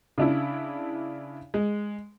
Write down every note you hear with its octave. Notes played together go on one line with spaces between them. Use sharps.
C#3 D4 E4
G#3